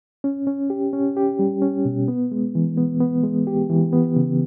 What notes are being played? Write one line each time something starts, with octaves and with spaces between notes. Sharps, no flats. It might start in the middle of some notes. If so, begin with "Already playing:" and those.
C#4
C#4
G4
C#4
G4
G3
C#4
B2
B3
G#3
E3
B3
B3
G#3
G4
E3
B3
C#3